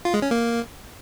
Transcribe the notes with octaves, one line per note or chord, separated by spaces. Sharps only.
F4
G#3
C#4
A#3